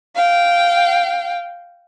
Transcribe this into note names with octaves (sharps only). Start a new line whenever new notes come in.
F5 G5